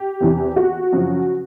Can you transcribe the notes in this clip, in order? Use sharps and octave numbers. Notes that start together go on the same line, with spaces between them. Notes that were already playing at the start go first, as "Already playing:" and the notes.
Already playing: G4
E2 C3 E3
F#4
F#2 C#3 F3